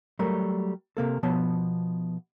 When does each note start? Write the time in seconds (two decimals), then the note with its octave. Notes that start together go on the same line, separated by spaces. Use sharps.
0.19 F#3 G3 A3 A#4
0.97 C3 A#3 A4
1.23 B2 F3 B3 C#5 A5